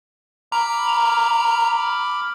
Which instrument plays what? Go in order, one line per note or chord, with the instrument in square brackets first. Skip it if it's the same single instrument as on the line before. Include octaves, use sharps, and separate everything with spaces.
[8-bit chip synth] A#5 [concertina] B5 D6 F6